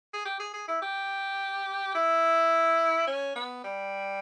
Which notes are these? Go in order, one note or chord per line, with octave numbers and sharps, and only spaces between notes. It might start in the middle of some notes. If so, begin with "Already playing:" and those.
G#4
G4
G#4
G#4
E4
G4
E4
C#4
B3
G3